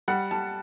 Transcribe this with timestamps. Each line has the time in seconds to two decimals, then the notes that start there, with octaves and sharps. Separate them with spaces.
0.08 G3 F#5
0.31 G3 A5